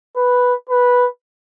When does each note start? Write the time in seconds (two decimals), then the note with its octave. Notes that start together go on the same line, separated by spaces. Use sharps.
0.16 B4
0.69 B4